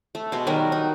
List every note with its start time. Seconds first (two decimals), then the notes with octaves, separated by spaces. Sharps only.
0.15 A3
0.32 B2 G#3
0.47 D#3 F#3 G3 A#4
0.72 D#4